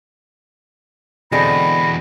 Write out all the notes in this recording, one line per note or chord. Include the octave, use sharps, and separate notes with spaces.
E2 B2 D3 G#3 C4 B5 A#6